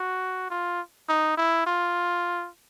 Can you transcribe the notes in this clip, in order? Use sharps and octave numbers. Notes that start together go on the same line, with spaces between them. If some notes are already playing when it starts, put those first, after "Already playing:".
Already playing: F#4
F4
D#4
E4
F4